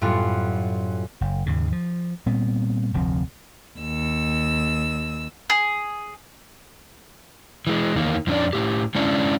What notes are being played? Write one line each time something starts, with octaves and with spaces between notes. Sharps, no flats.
F#2 A2 G3 B3 F4
F#1
D#2 G#2 C#3
F3
A#2 G3 B3 C4
F1 D2 F3 C4
D#2 E6
G#4
E3 G#3
E2 D#3 A#3
F2 F3 C#4 D4 D5
A2 G4
G#3 C#4 D4 E4